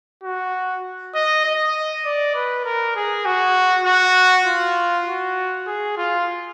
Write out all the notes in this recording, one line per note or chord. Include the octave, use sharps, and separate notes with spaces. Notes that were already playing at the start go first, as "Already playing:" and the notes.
F#4
D#5
D#5
D5
B4
A#4
G#4
F#4
F#4
F4
F#4
G#4
F4